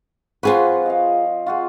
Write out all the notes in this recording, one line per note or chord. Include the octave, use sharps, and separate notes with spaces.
F3 C4 F4 F#4 G#4 B4
D#5 F5
F4 F#4 G#4